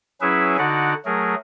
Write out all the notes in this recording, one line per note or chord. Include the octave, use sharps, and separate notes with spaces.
F#3 C#4 E4 G#4 B4 E5
D3 D#4 F#4 D5 F#5
F#3 A3 G#4 A#4